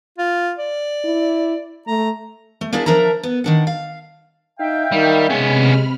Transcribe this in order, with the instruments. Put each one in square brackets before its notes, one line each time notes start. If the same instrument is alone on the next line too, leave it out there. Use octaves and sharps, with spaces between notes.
[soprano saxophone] F4
D5
[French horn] E4
[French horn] A3 [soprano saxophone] A#5
[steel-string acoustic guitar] A3
A#3 D4 E4 G#4 D5
F3 D4 A#4 E5 A#5
B3
D#3 D4 F#5
F5
[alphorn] D#4 [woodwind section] E5 F5 G5
[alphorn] D#3 [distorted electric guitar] G3
[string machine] C3 B5 F6 [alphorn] G#3 [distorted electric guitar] B3 C#4